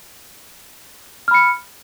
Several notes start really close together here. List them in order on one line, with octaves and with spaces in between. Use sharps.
F6 B5 C#7